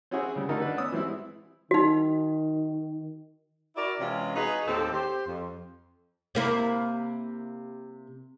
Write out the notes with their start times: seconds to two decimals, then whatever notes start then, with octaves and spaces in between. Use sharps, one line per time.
0.11 C4 C#4 E4 F#4 G#4 C5
0.36 C#3 G3
0.49 D3 D#3 A3 D#4 A4
0.61 D4 B4
0.77 B3 C#4 D#6 E6
0.92 E3 G3 G#3 C4 E4
1.71 D#3 D#4 F#4
3.76 E4 F#4 A#4 D5
4.00 C3 E3 G#3 C#4 F4
4.35 D#4 F#4 G#4 B4 D#5
4.67 D#2 A2 C4 G4 A4
4.94 G4 C5
5.27 F2
6.35 C3 A#3 E4